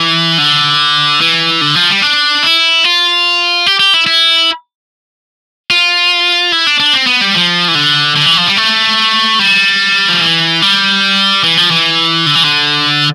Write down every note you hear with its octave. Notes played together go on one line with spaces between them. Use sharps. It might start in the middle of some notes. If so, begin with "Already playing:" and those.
Already playing: E3
D3
E3
D3
F3
G3
D4
E4
F4
G4
G4
E4
E4
F4
E4
D4
D4
C4
B3
G3
F3
E3
D3
D3
E3
F3
G3
A3
G3
F3
E3
G3
E3
F3
E3
D3
E3
D3